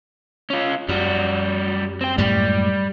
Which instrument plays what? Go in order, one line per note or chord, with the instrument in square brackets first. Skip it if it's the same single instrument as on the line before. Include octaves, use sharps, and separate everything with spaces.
[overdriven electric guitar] C#4 F4
[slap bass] F#2 [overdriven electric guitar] G3 F#4
[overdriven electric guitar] C4 G5
[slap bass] F#2 A2 G#3 [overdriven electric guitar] G3